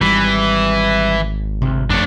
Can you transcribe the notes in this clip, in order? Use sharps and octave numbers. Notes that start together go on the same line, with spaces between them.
G#1 E3 G3
D2 C3
F2 A3 D4 C#5